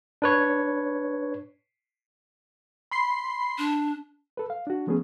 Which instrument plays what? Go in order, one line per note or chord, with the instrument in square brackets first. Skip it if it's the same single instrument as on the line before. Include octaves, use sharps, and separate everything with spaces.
[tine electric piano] D4 B4 C#5
[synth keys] B5 C6 C7
[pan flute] D4
[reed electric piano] A4 B4
F5
D4 F#4
F3 A3 B3 C#4 G#4